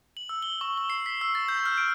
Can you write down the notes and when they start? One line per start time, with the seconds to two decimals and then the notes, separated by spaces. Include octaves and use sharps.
0.17 F#7
0.29 E6
0.42 G7
0.61 C#6
0.78 G7
0.90 C7
1.06 B6
1.21 E6
1.35 A6
1.48 G6
1.65 F6
1.78 D7